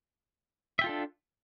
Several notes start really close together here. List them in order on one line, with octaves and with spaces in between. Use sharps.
E5 G5 F4 A4 D4